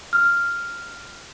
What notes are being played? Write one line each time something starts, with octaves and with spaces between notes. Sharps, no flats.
F6